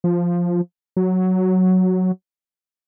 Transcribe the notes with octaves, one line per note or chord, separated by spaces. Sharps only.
F3
F#3